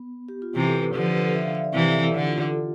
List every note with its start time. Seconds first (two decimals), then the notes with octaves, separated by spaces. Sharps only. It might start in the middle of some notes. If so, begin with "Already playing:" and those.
Already playing: B3
0.28 G4
0.42 F4
0.55 C3 E3 G4
0.65 A4
0.75 B4
0.85 G4
0.94 D3 F3 A4
1.04 G4
1.15 B4
1.35 E5
1.45 F5
1.55 E5
1.64 D5
1.74 C3 E3 E5
1.87 A4
2.01 A4
2.13 D3 G4
2.27 F4
2.40 A4
2.53 A4